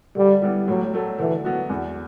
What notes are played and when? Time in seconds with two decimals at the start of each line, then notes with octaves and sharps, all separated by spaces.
0.16 D3 G3
0.42 G3 B3 E4
0.68 A2 F#3
0.94 F#3 A3
1.19 D3 E3
1.44 F#3 B3 F#4
1.69 E2